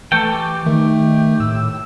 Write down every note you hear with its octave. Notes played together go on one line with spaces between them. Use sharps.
E3 A3 A4 G5 C#6
G4
D#3 A3
A2 E6